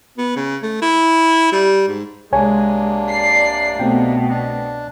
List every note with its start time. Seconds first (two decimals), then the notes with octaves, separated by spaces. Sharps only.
0.18 B3
0.36 C#3
0.63 A3
0.82 E4
1.52 G3
1.88 G#2
2.32 C2 C3 G#3 A#3 D4 C#5 G#5
3.10 D5 C7
3.80 B2 A3 C4 G5
4.30 D4